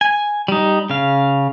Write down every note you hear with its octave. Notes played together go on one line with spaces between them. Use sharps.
G#5
G3 D#4
C#3 F5